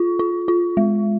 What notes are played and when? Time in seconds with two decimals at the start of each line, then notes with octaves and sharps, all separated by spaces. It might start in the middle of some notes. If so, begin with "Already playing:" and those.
Already playing: F4
0.19 F4
0.48 F4
0.77 G#3